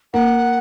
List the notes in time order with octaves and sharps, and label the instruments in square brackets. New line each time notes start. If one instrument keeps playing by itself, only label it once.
[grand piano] A#3 [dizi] F#5